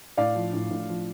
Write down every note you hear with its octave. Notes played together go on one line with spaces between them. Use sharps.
A2 D5 F5
F3
A2
A2
F3